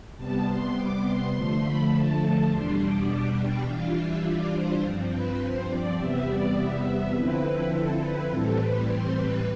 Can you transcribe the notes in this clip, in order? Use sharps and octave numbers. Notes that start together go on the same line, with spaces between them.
C3 G3 B3 A5
C6
D6
C6
D3 F3 A3
B5
A5
E2 B2 G3 D4 C6
D6
D6
G5
E3 G3 D4 F4 F5
E5
D5
C5
G2 F3 C4
B4
C5
D5
E2 C3 G3 B3 E5
D5
E5
D3 F3 C4 E4 B4
B4
A4
B4
A2 E3 G3 C4 A4
B4
C5
B4